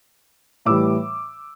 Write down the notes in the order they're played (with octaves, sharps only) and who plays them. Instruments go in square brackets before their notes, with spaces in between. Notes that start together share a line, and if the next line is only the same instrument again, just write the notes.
[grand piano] A2 E3 G3 D6 E6